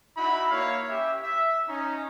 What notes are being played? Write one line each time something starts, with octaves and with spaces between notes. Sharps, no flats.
D#4 E4 F#4 B5
A#3 E4 C#5 F5
C#4 G4 E5
E5
C#4 D#4